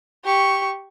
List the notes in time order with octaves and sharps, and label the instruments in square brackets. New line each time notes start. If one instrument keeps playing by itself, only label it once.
[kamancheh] G4 C#6